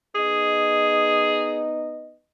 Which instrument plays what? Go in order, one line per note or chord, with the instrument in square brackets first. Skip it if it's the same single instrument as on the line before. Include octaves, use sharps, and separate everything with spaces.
[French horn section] B3 D#4 D#5 [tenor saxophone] G#4